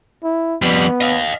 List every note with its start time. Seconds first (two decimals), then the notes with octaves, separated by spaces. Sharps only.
0.24 E4
0.62 F2 G3 B3
1.01 D#5 F5